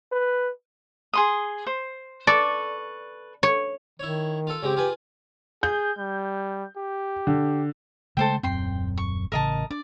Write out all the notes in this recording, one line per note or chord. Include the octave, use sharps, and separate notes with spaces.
B4
G#4 C6 D#6
C5
A4 B4 D5 C#6
C#5
D#3 E4 C#5
F4 A4
C#3 G#3 C4 G4
F4 G#4 B4
G#4 G6
G3
G4
D3
C#3 G#3 A3 A4 C5 G5
D#1 F#2 C4 G5 C6
C#6
A1 C#3 A#4 D#5 A5
D4 D5